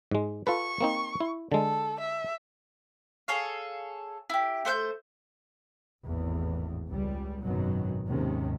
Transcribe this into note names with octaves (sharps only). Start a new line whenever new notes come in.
G#2 G#3
F4 A4 B4 C#6
A#3 C4 D#4
E4
D3 G#3 A4
E5
G#4 A4 C#5 F5
E4 G4
A3 C5 F#5 G6
G#1 E2 A2
C#2 G3
G#1 F#2 B2 D#3 F#3
D#2 G#2 C3 D#3 C#4